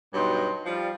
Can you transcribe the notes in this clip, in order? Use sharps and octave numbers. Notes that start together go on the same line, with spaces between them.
G2 B2 F#3 D#4 G5 C6
F3 G3